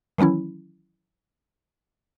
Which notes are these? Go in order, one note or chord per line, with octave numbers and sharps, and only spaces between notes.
D#3 E3 F#3 C#4 E4